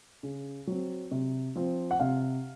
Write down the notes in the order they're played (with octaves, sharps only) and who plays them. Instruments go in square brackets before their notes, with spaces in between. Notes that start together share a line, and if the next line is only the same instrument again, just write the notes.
[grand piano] C#3
F#3 C4
C3
F3 C4
F#5
C3 F5